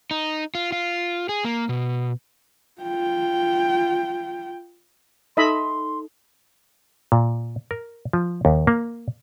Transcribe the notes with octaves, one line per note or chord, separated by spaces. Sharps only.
D#4
F4
F4
G#4
A#3
B2
F4 G5
D#4 A4 D#5 E5 A5 B5 C6
A#2
A#4
F3
D#2
A#3